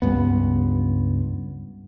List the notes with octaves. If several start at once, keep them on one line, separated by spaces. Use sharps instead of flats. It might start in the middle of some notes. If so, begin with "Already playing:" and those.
C#2 G2 B3